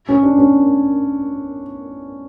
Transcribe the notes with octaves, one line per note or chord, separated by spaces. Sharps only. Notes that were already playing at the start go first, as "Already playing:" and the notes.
C#4
D4
C#4